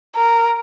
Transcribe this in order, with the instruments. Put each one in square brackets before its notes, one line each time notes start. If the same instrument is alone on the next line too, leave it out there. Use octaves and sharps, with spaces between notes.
[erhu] A#4